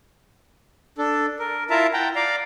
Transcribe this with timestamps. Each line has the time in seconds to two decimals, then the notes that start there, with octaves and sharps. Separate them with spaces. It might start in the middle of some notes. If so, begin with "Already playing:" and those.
0.98 D4 A4
1.39 A#4
1.70 E4 F4 A#4 E5 A5 A#5
1.93 F#5 G5 A5 A#5
2.15 D5 F5 A#5